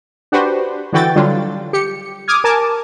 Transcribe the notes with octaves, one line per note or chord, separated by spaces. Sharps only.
D4 F#4 G4 B4 C5
D3 E3 F#4 G5 A6
D3 F#3 G3 D4 F4
G4 C#7
D6 D#6 F6 G#6
A#4 G#5 A5 D6